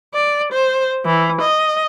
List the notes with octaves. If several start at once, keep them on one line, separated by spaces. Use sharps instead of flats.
D5
C5
E3
D#5